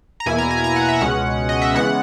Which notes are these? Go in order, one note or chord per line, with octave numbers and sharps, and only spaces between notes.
A#5
E2 B2 A#3 E4 G#5
A#5
G#5
A#5
F#5
E5
C#2 B2 G#3 C#4 F#5
D#5
E5
C#3 E3 G#3 B3 F#5